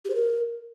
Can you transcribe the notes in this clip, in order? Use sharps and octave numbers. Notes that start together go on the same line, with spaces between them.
G4
C5
A#4